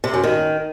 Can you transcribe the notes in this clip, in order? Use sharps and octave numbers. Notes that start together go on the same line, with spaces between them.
C3
F#2
D#3